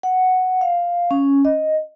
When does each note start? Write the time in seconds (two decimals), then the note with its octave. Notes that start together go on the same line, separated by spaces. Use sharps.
0.03 F#5
0.61 F5
1.11 C#4
1.45 D#5